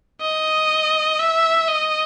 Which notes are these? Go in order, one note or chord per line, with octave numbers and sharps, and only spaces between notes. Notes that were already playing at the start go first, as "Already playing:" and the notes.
D#5
E5
D#5